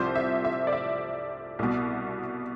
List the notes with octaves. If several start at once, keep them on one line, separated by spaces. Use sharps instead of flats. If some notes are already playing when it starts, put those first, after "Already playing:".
Already playing: C2 C3 F3 C5
E5
E5
D5
E5
C2 B2